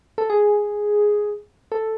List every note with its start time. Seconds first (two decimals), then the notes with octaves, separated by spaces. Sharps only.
0.18 A4
0.30 G#4
1.72 A4